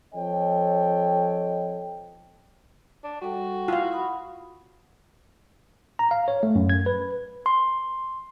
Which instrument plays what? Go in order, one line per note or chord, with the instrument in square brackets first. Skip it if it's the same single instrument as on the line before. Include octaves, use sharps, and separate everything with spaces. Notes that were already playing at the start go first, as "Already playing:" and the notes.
[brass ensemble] F3 C4 A4 C#5 D#5 G5
[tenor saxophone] D4
[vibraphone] G3 A4 G5 [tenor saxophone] F#4
[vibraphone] E4 [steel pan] F4 F5
[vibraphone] F#5 B5 D#6
[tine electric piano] A#5
F5
C#5
A3
F#2
G#6
B4
[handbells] C6